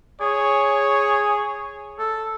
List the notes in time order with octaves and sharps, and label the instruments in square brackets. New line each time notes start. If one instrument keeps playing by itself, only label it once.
[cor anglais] G#4 [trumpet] C#5
[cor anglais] A4